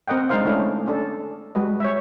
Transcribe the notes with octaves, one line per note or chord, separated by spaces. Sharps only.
C4 A#4 D#5 F#5 G5
G#3 D4 D#4 A#4 C5 F5
A3 C#4 D4 E4 C#5
C#4 D4 A4
G3 G#3 F#4 B4 D#5
C#5 E5